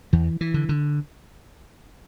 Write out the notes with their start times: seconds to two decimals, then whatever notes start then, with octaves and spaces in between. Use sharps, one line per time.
0.13 E2 E3
0.41 E3
0.54 D3
0.69 D3